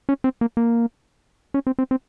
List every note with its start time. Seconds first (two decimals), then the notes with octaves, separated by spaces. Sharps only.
0.09 C#4
0.24 C4
0.41 A#3
0.57 A#3
1.54 C#4
1.67 C4
1.79 C4
1.91 C4